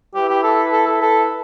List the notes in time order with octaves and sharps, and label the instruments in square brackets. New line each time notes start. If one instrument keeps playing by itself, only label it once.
[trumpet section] E4 B4 E5 [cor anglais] G4
[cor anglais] G4
A4
A4
A4
A4